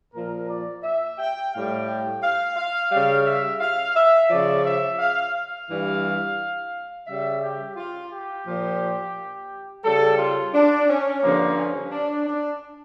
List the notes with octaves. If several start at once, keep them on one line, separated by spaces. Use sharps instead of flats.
A#2 F3 A#4
D5
E5
G5
A2 G3 F5
G5
F5
F5
C#3 G3 F5
E5
F5
E5
C#3 F3 D5
E5
F5
F5
G2 E3 G3
C#3 G3 E5
G4
F4
G4
A#2 F3
C#3 G3 A4
F4
D4
C#4
G2 D3 F3 A#3
C#4
D4
D4